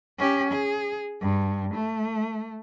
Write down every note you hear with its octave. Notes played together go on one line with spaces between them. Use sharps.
C#4 G4
G#4
G2
A3